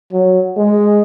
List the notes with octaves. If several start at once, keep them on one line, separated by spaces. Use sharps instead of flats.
F#3
G#3